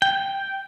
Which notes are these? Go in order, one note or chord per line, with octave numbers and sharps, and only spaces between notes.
G5